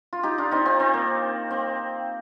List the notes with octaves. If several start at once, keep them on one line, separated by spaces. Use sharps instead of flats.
F4
D#4 G4
D4 F4
C4 D#4
C4
C4
A#3
C4